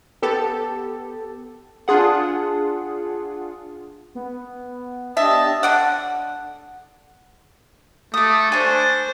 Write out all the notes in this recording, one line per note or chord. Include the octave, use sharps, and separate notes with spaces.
B3 G4 A4
D4 F4 G#4 F#5
B3
D4 G4 D#5 E5 A5
D3 D5 F#5
A3 D6 D#6
D4 C5 G#5 C#6